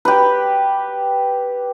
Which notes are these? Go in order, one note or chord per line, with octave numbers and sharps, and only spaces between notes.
G4 B4